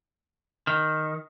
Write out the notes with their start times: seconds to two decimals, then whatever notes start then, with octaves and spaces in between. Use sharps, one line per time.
0.67 D#3